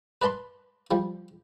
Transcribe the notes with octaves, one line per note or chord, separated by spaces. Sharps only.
B4 D5 A5 B5 C6
F3 G3